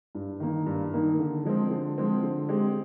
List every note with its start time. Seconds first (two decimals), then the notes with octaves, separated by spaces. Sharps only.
0.15 G2
0.40 D#3 A#3 D#4
0.66 G2
0.93 D#3 A#3 D#4
1.19 D3
1.45 F3 G#3 C4
1.71 D3
1.98 F3 G#3 C4
2.23 D3
2.49 G#3 C4 G4